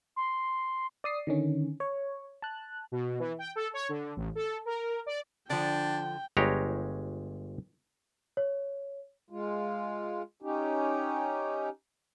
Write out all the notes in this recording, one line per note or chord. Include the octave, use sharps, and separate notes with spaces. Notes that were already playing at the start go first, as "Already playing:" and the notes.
C6
D5 D#6 C7
D3 D#3 C#4
C#5
A5 F#6
B2
E3
G5
A4
C#5
D3
A1
A4
A#4
D5
D3 F3 D4 G5
G1 G#3 G4 C#5 A#5
C#5
G#3 F4
C#4 D#4 G4